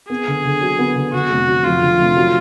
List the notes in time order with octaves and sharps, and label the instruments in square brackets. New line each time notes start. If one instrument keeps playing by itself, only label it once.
[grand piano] B3 [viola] G#4
[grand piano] D3
D3
F#3
B3
D3
[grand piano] D3 [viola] F#4
[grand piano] F1
F#3
[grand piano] F2 [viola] F4
[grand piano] D3
F1
F#3